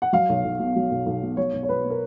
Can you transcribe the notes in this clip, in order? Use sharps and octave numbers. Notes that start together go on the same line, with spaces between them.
F#5
F#3 F5
B1
B1
B2
F#3
B1
B1
B2
F#3 C#5
B1
C#5
B1 B4
B2
A#4